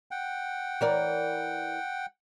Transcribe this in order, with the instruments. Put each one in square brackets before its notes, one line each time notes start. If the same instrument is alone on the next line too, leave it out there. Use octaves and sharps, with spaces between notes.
[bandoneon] F#5 G5
[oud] E3 A#4 D5